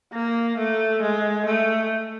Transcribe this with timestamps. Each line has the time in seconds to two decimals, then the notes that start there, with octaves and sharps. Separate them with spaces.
0.13 A#3
0.58 A3
1.02 G#3
1.46 A3